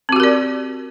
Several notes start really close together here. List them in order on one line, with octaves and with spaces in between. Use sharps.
C4 F#4 G4 A#4 D5